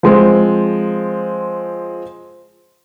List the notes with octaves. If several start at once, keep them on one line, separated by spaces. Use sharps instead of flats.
F3 G#3 C4